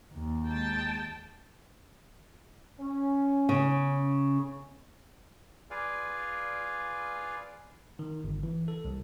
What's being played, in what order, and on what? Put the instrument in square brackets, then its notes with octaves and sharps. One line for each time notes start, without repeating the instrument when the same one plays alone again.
[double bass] D#2
[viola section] G#3 G5 A5
[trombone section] C#4
[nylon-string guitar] C#3
[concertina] F4 G#4 B4 D5 F5 G#5
[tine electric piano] D#3
G1
E3
A4
C2